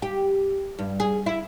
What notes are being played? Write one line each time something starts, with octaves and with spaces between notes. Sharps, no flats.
G4
G2
G#4
E4